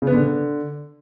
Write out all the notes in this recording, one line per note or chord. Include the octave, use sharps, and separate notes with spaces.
C#3
B3
D3